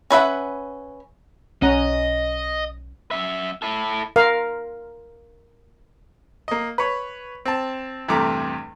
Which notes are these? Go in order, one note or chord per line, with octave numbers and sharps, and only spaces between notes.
C#4 B4 E5 F#5
B1 C#4 D#5 F#5 A#5
F#2 E5
E4 A4
A#4 F5
A#3 D#5
B4 C#5
C4 A5
E2 G2 C3 A3 A#5 D6